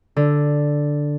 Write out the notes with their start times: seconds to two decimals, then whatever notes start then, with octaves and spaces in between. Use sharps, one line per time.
0.16 D3